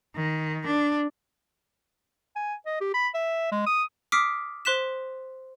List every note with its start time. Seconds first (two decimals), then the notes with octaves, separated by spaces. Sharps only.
0.16 D#3
0.67 D4
2.36 G#5
2.66 D#5
2.80 G4
2.94 B5
3.14 E5
3.52 G#3
3.66 D#6
4.12 D6 D#6 F6 B6 C7 D7
4.65 C5 C6 F#6 B6 E7